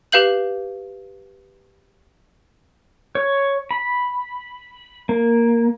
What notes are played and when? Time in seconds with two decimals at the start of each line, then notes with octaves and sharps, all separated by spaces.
0.12 G4 B4 F5 G6 F#7
3.15 C#5
3.71 B5
5.09 A#3